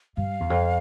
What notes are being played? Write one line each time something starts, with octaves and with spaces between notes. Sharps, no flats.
G2 F5
E2
F2